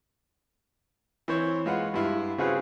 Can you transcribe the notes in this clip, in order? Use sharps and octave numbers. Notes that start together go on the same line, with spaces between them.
E3 C4 C5 C#5
G#3 F4 B4 F#5
G2 E4 F4
C#3 C4 F4 F#4 G#4 B4